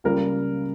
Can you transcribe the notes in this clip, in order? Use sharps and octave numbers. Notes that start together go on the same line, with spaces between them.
C#2 C#3 G3 A#3 A#4